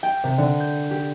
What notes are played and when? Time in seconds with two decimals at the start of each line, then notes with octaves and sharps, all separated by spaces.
0.03 G5
0.24 C3
0.38 D3
0.60 G6
0.91 G4